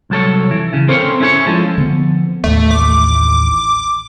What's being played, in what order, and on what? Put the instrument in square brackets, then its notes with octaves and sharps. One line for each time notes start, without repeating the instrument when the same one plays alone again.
[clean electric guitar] C2 F#3 A4 C#5
E3
C#3
C4 C#4 A4 A#4 C5 C#5
C#4 E4 G#4 B4 C#5
F3 G#3 A4
[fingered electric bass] D3 F3 B3
[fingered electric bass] A1 D#2 [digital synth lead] A3
[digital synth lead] D6